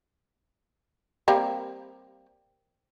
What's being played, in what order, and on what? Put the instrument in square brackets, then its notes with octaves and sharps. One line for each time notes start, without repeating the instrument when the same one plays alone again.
[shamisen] G3 A#3 C4